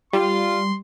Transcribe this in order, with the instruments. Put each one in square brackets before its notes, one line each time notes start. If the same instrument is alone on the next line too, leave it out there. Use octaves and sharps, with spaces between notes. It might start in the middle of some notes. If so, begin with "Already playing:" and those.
[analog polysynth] G3 [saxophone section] F4 [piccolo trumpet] C6